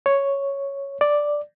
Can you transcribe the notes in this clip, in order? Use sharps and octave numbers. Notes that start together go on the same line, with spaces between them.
C#5
D5